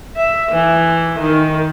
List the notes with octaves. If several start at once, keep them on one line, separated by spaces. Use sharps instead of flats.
E5
E3
D#3